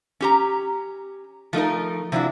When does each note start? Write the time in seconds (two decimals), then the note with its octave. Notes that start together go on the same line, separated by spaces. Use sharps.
0.20 C#4 G4 A#5
1.53 F3 A3 D#4 A#4
2.12 C3 F3 D4 E4 F#4